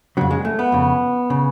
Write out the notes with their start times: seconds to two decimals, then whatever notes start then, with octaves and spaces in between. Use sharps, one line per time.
0.17 F2 C#3 F#3
0.31 G#3
0.45 A3
0.59 B3
0.72 F2 C#3
1.30 C#3